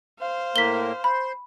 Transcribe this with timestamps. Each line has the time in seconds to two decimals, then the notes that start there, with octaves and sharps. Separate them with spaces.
0.19 C5 F5
0.56 A2 A#3 B6 G7
1.04 C5 B5